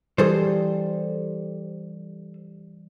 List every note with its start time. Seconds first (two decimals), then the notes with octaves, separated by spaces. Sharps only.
0.18 E3 G3 G#4 A4 C5